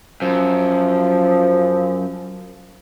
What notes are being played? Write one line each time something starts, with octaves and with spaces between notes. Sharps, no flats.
F#2 F3